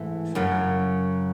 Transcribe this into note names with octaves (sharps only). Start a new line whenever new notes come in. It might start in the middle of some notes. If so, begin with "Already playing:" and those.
Already playing: G#2 E3 A3
F#2 C#3 F#3